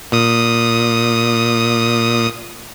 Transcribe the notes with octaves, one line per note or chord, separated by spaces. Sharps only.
A#2 D#6